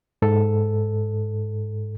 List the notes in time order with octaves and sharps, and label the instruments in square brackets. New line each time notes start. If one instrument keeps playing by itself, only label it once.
[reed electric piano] G#2 A4